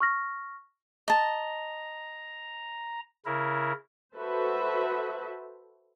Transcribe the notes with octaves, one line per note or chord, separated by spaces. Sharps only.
C#6 F6 A#6
D#5 A5 A#5
C#3 E4 A#4
F#4 A4 B4 C5 E5